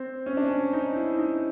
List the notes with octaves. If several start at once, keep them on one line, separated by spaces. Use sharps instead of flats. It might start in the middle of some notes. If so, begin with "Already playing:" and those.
Already playing: C4
C#4
D4
C#4
D#4
E4
D#4